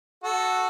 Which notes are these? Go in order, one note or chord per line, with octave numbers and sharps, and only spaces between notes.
F#4 A4